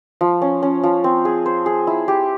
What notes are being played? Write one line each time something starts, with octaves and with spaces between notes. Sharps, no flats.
F3
C#4
C#4
F3
C4
G#4
C5
G#4
E4
G4